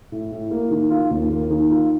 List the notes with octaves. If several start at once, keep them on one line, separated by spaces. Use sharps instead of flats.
A2
A2
A#3
D#3
F4
D#2
A#3
D#3
F4